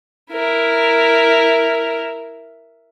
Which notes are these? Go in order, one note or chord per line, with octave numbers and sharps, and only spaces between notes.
E4 A#4